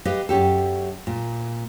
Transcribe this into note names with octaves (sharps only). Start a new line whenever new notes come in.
G4 B4 D#5 F5
F#2 C#4 G4 A4
A#2